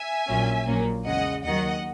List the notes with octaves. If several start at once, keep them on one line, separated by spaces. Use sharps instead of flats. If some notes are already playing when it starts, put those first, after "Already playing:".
Already playing: E5 G#5
A#1 A#2 F#3 C#4
A#1 A#2 F#3 A#3 C#4
E2 C#3 G#3 D#5 F#5
D#2 D#3 F#3 D#5 F#5